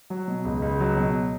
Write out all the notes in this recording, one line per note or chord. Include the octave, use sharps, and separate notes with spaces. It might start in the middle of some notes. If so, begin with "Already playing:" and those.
F#3
B2
C#2
C#2
F#3
B2